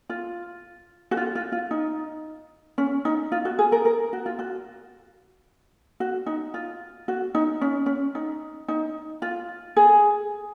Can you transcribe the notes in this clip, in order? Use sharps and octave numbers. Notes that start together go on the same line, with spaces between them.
F4
F#4
F4
F4
F4
D#4
C#4
D#4
F4
F#4
G#4
A#4
A#4
F#4
F4
F#4
F#4
D#4
F4
F#4
D#4
C#4
C#4
D#4
D#4
F4
G#4